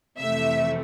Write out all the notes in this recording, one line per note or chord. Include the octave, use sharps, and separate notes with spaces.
F2 C3 E3 A3 E5